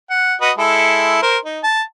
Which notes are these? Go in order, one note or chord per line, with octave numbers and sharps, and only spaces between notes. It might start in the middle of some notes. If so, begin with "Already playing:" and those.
F#5
F#4 B4 D#5
G#3 E4 A4
A#4 C5
D#4
A5